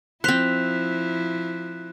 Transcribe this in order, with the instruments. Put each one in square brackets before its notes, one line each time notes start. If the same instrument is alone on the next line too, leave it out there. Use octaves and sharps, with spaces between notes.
[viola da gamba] F3 E4 [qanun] C4 C5 [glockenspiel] F#6 B6 F7